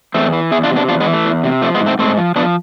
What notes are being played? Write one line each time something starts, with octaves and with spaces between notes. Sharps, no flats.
E2 A3 C4
E3
E2 E4 G#4
D4 F4
C3
B3 D4
E2 D4 F4
G#3 B3
E3
A3
E2
C3
F3 A3
G#3 B3
G#2
A3 C4
G#2 A3 C4
F3
F3 B3 D4